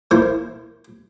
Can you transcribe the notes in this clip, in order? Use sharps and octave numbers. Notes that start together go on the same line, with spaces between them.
F3 A#3 E4 A#4 C5